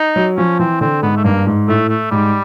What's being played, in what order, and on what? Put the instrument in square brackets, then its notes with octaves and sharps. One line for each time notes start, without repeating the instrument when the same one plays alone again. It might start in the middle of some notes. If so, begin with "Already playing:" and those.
Already playing: [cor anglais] D#4
[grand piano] F#3
[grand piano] F3 [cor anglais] C#4
[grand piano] E3 [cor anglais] C4
[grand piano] D3 [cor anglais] C4
[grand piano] G#2 [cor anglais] B3
[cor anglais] A3
[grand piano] G2 [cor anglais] A#3
[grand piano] G#2
[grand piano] A2 [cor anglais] A3
[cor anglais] A3
[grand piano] G#2 [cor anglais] G3